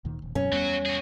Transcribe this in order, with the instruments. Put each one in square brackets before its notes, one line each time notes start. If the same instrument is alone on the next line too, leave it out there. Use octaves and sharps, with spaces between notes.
[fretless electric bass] D2 A#2 D#3
D#1
[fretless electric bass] F#2 B2 F#3 [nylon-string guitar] C#4
[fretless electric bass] E2 G3 B3 [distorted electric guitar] F#3 F#4
[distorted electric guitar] F#4 G#4